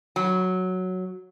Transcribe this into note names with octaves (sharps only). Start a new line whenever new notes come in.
F#3